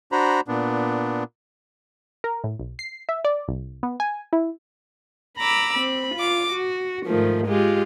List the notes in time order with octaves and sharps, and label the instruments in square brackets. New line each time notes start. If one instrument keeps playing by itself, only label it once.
[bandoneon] D4 F#4 C5 A#5 B5
A#2 B3 D4
[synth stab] A#4
A2
B1
C7
E5
D5
C2
B3
G#5
E4
[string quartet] A#5 B5 D6 E6
C4 B5
F4 D6
F#4
G#2 D#3 F3 A3
G#3 F4 G4